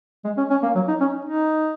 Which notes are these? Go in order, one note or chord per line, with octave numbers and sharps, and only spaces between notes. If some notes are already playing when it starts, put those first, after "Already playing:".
G#3
C#4
C#4
A#3
F#3
D#4
C#4
D#4